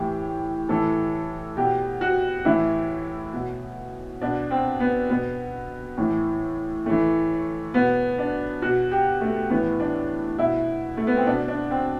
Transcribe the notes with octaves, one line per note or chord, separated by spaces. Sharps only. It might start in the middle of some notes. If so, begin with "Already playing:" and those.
Already playing: A2 E3 G4
A2 E3 A4
B2 G4
F#4
A2 E3 E4
B2
B2 D4
C4
B3
B2 B3
A2 E3
A2 E3 A3
B2 B3
D4
B2 F#4
G4
A3
A2 E3 B3
D4
B2 E4
A3
B3
C4
B2 D4
D4
C4